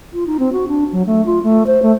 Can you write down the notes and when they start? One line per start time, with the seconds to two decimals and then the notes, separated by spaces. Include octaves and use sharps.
0.13 F4
0.27 D#4
0.39 C4
0.53 F#4
0.68 D4
0.93 F#3
1.06 A3
1.26 F4
1.43 A3
1.67 C5
1.83 A3